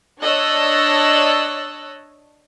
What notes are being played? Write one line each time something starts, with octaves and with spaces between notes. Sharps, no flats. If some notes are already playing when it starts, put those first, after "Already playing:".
D4 C#5 D#5 E6 F#6 A6